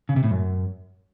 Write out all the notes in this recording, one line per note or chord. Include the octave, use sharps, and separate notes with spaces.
C#3
C3
A2
F#2